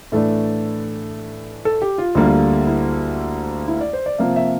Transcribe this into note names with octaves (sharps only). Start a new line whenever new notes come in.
A2 E3 A3 D4 A4
A4
G4
F4
D2 D3 G3 A#3
E4
E4
D5
C5
D5
C3 F3 A#3 E5
E5